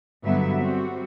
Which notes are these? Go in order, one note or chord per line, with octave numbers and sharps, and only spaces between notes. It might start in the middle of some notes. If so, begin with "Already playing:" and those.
G2 D3 F#3 B3 B4 E5
G3 C4 F#4